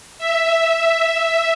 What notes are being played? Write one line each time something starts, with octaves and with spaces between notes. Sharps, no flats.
E5
E5